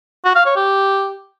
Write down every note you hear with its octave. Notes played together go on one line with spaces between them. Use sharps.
F#4
F5
C#5
G4